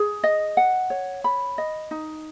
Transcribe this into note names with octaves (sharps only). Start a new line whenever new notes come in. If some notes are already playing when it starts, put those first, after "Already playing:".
Already playing: G#4
D#5
F#5
C#5
B5
D#5
D#4